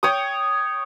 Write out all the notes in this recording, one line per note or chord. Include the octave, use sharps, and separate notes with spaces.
C#5 G5 D#6